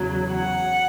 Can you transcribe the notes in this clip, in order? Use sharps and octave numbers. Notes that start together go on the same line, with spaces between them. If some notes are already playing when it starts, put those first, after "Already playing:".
Already playing: E2 C#3 F#3
F#5